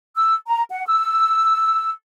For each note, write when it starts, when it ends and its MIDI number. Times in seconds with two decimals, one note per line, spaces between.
0.16 0.35 88
0.46 0.63 82
0.70 0.86 78
0.87 1.91 88